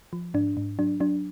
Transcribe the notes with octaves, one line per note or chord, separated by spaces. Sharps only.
F3
G#2 D4
G#2
F#3 D4
F#3 D4